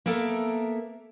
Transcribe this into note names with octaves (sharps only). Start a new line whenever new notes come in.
A#3 B3 A4 A#4 E5